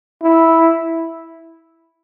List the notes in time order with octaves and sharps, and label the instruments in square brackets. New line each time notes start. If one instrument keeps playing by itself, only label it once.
[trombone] E4